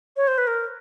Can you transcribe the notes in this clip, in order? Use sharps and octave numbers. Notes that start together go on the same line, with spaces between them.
C#5
C5
B4
A#4